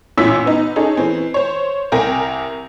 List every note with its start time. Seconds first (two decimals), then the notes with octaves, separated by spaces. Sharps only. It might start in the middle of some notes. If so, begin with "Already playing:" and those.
0.17 A1 A#2 C#4 E4 E6 B6
0.46 B3 D#4
0.76 C#4 D#4 G#4 A4 C#5
0.97 E3 C4
1.34 C5 C#5
1.92 C2 A#4 G5 G#5 A#6